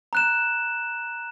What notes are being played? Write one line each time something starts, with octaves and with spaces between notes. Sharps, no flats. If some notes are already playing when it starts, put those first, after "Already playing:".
A#5 F#6 E7